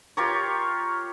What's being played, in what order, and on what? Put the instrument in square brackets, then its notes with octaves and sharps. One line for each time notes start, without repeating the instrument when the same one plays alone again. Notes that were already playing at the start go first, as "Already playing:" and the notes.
[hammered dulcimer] F4 G4 A#4 C#5